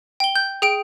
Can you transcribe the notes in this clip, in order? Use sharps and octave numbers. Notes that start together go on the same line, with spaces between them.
G5 G7
G6
G#4 G5 D7